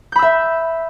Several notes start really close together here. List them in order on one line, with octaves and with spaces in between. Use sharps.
G6 B5 E6 E5